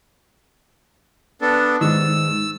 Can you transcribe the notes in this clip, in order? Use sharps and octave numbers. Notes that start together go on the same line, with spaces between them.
B3 D4 A4
G#2 D#3 E6